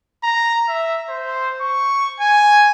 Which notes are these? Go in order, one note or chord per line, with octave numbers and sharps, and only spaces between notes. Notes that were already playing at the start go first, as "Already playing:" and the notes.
A#5
E5
C5
C#6
G#5